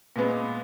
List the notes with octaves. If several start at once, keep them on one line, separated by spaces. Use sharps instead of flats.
A#2 G#3 B3